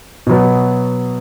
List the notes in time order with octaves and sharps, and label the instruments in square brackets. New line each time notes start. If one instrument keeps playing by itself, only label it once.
[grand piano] B2 F#3 B3